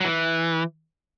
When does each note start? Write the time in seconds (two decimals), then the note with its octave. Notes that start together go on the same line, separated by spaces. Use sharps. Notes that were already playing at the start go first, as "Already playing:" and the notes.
0.01 F#3
0.05 E3